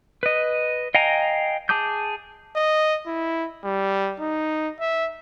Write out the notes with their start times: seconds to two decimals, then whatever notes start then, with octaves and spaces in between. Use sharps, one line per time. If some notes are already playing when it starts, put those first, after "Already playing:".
0.23 B4 D#5
0.95 D#5 F5 G5 G#5 A#5
1.69 G#4 A5 D6 D#6 G6
2.56 D#5
3.07 E4
3.64 G3
4.20 D#4
4.80 E5